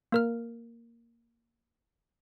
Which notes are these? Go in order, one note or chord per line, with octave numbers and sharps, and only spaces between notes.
A#3 A#4 F6